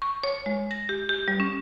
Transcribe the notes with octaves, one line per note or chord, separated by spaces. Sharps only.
C#6
C#5
G#3
A#6
G4
G4
G3
C#4